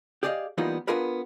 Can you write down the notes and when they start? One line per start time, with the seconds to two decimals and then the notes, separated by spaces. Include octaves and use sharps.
0.23 G4 G#4 D5 D#5 F5
0.58 E3 G3 A#3 B3 D#4 F4
0.87 B3 D4 F4 G#4 A#4 B4